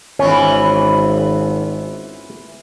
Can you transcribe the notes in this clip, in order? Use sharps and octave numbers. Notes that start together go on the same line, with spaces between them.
G#1 E3 B3 C#4 F4